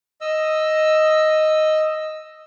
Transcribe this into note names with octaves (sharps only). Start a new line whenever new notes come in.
D#5 E6